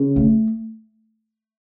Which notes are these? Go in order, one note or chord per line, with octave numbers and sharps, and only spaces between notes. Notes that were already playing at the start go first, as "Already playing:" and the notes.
Already playing: C#3
A3